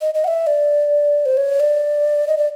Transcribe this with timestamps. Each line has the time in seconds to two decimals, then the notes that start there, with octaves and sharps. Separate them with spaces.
0.01 D#5
0.14 D#5
0.24 F#5
0.28 E5
0.47 D5
1.26 C5
1.37 C#5
1.60 D5
2.28 D#5
2.37 D5